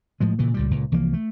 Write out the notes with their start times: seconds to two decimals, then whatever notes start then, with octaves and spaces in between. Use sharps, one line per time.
0.20 A2 F3 G#3
0.39 A#2 C#3 E3
0.54 C#2 A#2 G3
0.71 C#2 A#2
0.92 C2 E3 F3 A#3
1.13 A3